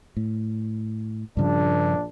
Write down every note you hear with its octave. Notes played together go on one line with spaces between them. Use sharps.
A2
A#1 G2 C#3 F3 D4